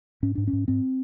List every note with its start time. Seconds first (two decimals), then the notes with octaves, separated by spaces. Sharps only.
0.23 G#2 C#4
0.35 G#2 D4
0.47 C#4
0.53 G#2
0.68 G#2 C4